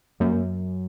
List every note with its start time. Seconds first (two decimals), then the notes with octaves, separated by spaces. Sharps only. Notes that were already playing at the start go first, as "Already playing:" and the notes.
0.20 F#2 A#3